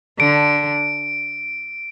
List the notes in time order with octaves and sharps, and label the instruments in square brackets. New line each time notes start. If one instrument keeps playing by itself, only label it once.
[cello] D3 [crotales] D7